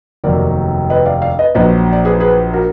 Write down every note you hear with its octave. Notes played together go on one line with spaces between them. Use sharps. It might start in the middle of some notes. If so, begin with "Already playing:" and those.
F1 D#2 D#3 F#3 A#4 D5
B4 D#5
D5 F5
D5 F5
B4 D#5
A#1 A#2 F#3 B4 D#5
D5
G#4 B4
G#4 B4
F#4 A#4